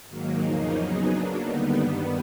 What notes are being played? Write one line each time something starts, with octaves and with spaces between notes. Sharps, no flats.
G#2 D#3 F#3 A#3
E2 C#3 F3 A#3 D#4
F#3 B3 D#4 G#4
F#3 A#3 D4
D#2 D3 G3 B3 D#4
G2 D#3 G3 B3